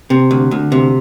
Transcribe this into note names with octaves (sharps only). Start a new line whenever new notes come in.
C3
D2
D2
C3